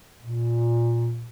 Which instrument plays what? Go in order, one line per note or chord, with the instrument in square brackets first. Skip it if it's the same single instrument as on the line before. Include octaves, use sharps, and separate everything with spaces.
[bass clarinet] A#2